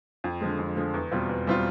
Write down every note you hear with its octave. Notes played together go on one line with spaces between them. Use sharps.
F2
D3 F3 G#3
F2
D3 F3 G#3
E2
B2 G3 C4 F4
E2
B2 G3 C4 F4